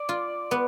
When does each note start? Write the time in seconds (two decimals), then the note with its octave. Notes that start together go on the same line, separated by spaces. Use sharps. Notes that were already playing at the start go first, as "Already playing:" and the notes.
Already playing: D5
0.09 F4
0.51 B3